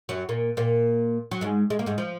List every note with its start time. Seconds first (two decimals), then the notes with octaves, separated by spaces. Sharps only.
0.09 F#2 F#3
0.29 A#2 A#3
0.57 A#2 A#3
1.31 F#3
1.41 G#2 G#3
1.70 G#3
1.79 A#3
1.86 G#2 G#3
1.98 F3